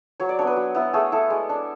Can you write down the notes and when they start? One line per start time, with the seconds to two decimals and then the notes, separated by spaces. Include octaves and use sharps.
0.20 F#3 C#5
0.29 D5
0.39 B3 D4 C#5
0.47 B4
0.56 F#3
0.75 B3 E4
0.93 A3 G#4
1.12 E4 A4
1.30 G#3
1.49 D4